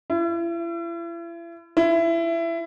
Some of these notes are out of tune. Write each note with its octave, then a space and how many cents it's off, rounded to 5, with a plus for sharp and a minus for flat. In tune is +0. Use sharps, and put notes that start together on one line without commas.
E4 +40
E4 +20